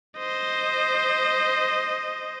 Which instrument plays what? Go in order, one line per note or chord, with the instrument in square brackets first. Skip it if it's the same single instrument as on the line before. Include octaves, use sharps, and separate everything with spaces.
[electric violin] C5 D#5